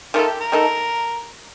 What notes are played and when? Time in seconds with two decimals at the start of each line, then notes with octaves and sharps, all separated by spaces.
0.14 D#3 A3 D#4 F4 A4
0.27 G4
0.40 A#4
0.52 D#3 A3 D#4 A4